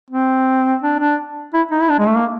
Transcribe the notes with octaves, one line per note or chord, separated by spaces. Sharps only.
C4
D4
D4
E4
D#4
E4
D4
G#3
A3
A#3